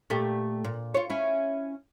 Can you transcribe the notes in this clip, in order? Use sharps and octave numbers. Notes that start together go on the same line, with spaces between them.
A#2 A3 G4
A#2
F4 C#5
C#4 E4